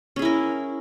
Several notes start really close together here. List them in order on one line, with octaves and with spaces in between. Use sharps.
C#4 G#4 E4 A#4